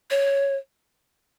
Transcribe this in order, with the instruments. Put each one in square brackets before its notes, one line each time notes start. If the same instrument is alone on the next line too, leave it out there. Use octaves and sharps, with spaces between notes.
[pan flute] C#5